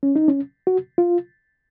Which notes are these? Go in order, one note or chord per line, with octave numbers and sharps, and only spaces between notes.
C#4
D#4
C#4
F#4
F4